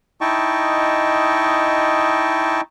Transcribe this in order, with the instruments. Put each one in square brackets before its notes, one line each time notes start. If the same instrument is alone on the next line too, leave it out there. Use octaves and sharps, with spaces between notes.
[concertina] D#4 E4 D#5 G5 A5 C#6